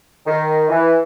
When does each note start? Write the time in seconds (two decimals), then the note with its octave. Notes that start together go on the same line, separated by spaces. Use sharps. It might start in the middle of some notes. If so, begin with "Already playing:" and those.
0.26 D#3
0.69 E3